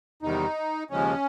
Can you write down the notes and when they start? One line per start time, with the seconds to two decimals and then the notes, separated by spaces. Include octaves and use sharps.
0.22 E2 C3 D#3 G3 D#4
0.90 D#2 C#3 F3 G#3 C#4